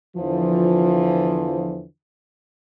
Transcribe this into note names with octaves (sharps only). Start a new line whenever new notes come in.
E2 D3 E3 F3